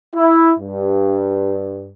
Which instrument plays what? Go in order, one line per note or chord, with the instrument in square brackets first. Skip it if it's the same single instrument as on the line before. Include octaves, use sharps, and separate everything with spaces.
[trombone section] E4
G2